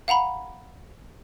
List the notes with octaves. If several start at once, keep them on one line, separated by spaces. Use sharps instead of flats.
F5 F#5 A#5 B5